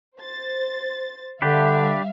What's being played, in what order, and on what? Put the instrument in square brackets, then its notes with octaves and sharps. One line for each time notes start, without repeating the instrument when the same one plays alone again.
[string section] C5 A6
[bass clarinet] D3 [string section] G3 E5 F5 [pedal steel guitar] D4 G4 B4